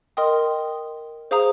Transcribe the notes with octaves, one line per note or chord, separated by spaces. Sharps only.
A#4 D#5 G5 C6 D#6
G#4 C5 F5 A#5 D#6